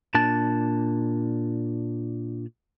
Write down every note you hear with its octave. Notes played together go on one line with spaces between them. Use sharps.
A#2 D4 A5